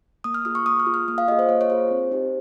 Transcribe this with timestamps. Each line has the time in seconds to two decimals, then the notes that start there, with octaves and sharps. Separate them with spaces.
0.24 A#3 D#6
0.34 F6
0.45 F4 G#4 D#6
0.55 C#6
0.65 A#3 D#6
0.80 F6
0.86 F4 G#4
0.94 F6
1.08 A#3 D#6
1.18 F5
1.28 F4 G#4 D#5
1.39 C5
1.49 A#3 C#5
1.61 C#5
1.70 F4 G#4 C5
1.91 C4
2.12 D#4 G4